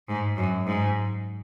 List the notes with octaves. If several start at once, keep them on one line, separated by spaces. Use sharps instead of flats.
G#2
F#2
G#2